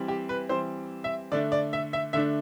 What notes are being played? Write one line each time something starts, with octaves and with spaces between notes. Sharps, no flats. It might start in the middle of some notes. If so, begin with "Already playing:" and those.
Already playing: E3 G3 C4
G4
B4
E3 G3 C4 C5
E5
D3 A3 D4 D5
D5
E5
E5
D3 A3 D4 E5